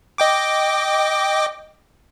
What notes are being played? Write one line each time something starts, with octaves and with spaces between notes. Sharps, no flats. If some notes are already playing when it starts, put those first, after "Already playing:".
D#5 G5 D6